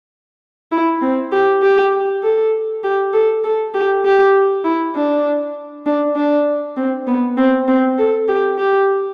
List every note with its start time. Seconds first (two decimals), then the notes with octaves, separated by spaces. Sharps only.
0.72 E4
1.01 C4
1.32 G4
1.62 G4
2.23 A4
2.84 G4
3.13 A4
3.44 A4
3.74 G4
4.05 G4
4.64 E4
4.95 D4
5.86 D4
6.16 D4
6.77 C4
7.07 B3
7.37 C4
7.68 C4
7.98 A4
8.28 G4
8.58 G4